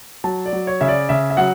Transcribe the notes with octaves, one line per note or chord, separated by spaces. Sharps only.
F#3 A5
D5
F#3
C#5
C#3 E5
D5
C#3 E5
E5
F#3 F#5